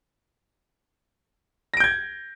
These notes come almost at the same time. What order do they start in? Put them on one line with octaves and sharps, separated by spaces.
A#6 D7 G6 G#6